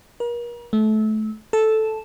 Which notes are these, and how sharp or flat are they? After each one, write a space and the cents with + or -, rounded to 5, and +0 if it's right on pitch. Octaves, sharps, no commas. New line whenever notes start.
A#4 +40
A3 -25
A4 -5